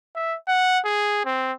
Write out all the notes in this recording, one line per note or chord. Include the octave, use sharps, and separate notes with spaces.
E5
F#5
G#4
C4